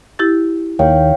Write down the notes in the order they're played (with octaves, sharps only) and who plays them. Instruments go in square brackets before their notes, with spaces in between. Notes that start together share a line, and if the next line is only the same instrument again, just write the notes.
[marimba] E4 G4 A6
[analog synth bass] D#2 [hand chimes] C#5 F5 G5